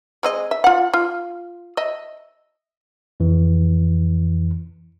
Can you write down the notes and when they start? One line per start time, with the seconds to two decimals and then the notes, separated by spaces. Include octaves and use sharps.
0.23 G#3 C4 D#5
0.51 E5
0.64 F4 F#5
0.94 F4
1.77 D#5 E5
3.20 F2 E3